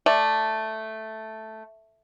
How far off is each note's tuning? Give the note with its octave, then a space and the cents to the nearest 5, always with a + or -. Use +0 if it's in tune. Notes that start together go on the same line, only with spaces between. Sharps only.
A3 +0 D5 +0